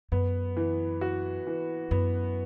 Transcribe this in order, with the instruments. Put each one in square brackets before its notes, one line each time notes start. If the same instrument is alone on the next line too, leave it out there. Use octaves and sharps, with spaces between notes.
[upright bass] F#2 [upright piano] B3
[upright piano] E3
F#4
E3
[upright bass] F#2 [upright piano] B3